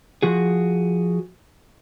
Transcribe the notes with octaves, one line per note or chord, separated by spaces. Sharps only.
F3 F#4 G#4